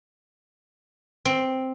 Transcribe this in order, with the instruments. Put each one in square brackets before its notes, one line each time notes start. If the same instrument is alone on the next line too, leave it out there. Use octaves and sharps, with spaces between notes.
[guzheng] C4